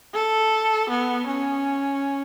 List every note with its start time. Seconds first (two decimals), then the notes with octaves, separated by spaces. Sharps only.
0.14 A4
0.89 B3
1.27 C#4